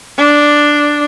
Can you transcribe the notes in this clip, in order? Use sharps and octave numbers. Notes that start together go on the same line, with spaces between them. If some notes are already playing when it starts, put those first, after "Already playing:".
D4